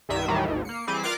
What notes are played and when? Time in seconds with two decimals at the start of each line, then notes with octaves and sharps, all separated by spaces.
0.09 C2 G2 D#3 E5 D#6
0.28 D#2 A2 D#3 E3 F#3 G3
0.48 G#1 D2 G#2
0.65 A#3 C7 C#7
0.87 E3 G3 C4 G#4 D6
1.03 F4 A#4 D5 D6 F#6 C7